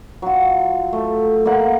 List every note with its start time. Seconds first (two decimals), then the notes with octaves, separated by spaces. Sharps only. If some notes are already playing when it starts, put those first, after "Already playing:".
0.22 F#3 F4
0.93 A3
1.45 A#3 F4 E5 F#5